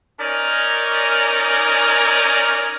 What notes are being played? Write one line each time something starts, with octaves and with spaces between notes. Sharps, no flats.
C#4 D#4 A#4 D5 G#5